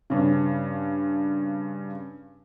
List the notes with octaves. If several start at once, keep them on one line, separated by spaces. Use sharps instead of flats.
G2 C#3